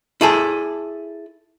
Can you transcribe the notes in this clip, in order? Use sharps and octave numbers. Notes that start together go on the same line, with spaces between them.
E4 G#4 A4